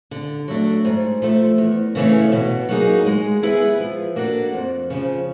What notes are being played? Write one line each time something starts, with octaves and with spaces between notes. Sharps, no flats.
D3
F#3 A3 D4
G#2
F3 A3
E2
C#3 E3 A3 C#4
B2
F#3 A#3 D#4 G#4
G#3
B3 E4 G#4 B4
F3
A#3 D4 F#4 A4
F2
C#3 F3